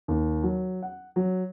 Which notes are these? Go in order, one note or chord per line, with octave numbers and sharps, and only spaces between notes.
D#2
F#3
F#5
F#3